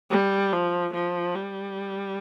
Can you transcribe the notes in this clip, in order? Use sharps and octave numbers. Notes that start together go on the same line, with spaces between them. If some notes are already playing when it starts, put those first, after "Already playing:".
G3
F3
F3
G3